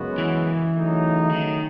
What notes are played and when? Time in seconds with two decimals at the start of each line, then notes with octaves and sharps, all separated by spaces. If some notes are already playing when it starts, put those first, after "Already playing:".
Already playing: F#2 C#3 G#3 B3 F#4
0.18 E3
0.74 C#3 F#3 A3 D#4
1.30 D#3